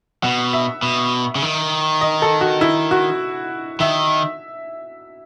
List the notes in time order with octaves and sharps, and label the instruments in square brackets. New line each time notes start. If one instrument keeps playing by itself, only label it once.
[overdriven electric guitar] B2 [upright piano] F#5
[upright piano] E5
[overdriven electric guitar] B2
C#3
D#3
[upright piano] D#5
A4
F#4
E4
F#4
[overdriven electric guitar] D#3 [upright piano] E5